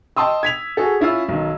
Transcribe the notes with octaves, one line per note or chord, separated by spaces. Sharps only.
D#5 G5 A5 C6 D#6 E6
G#6 B6 F7
F#4 G#4 A4
C#4 E4 F4 F5 E6
B1 D#3